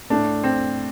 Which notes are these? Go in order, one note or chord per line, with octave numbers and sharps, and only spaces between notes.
A2 A3 D4
C4